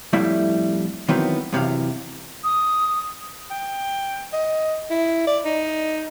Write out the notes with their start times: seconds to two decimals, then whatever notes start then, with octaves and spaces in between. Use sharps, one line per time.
0.13 F2 A2 G3 A3 E4 E5
1.09 D#3 E3 F#3 B3 C4
1.53 F#2 C3 E3 F5
2.44 D#6
3.51 G5
4.33 D#5
4.90 E4
5.27 D5
5.45 D#4